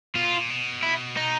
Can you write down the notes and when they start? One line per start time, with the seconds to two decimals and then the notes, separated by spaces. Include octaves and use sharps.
0.15 B2 F4
0.25 A#2
0.32 B2
0.41 A#2
0.50 B2
0.83 E4
1.17 D#4